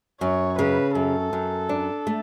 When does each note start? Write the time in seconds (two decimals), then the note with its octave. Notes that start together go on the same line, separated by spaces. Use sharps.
0.21 F#2 C#5
0.59 C#3 B4
0.95 F#2 A4
1.33 F#2
1.69 D4
2.07 A3